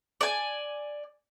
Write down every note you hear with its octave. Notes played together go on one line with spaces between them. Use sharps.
D5 G#5